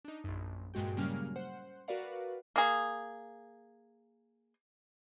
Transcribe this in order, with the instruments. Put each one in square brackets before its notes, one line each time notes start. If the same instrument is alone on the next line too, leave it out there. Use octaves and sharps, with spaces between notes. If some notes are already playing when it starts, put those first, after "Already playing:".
[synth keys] D4 D#4
A#1 F#2
G2 A#2 G#3 F#4 G5
C#3 F#3 G3 A#3 C#4 F6
C5 F#5
F#4 A#4 B4 D5 F5 F#5
[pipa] A#3 G#4